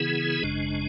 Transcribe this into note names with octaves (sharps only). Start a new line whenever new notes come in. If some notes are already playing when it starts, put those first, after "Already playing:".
Already playing: C#3 E3 B3 E4 G#4
G#1 F#2 C#3 G#3 D4